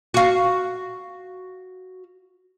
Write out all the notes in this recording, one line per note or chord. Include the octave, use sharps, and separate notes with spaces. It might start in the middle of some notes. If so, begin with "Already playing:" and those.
F#4 F5